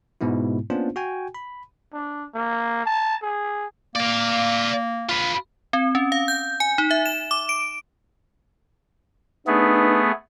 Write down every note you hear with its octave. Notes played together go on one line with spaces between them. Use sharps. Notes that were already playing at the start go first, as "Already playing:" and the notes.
G#2 B2 G#3 B3 E4
A#3 B3 C#4 D4 F4 C5
F#4 G5 G#5
B5
D4
A#3
A5
G#4
A#3 D5 F5
F4 B4
C4
C#4
F5
G6
G#5
D#4
E5
E7
D6
D7
A3 B3 D4 D#4 G#4 B4